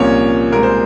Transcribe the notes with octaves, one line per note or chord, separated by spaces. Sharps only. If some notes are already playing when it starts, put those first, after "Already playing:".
Already playing: C2 A#2 F3 A#3 C#4 C#5
C2 A#2 G#3 A#4
C5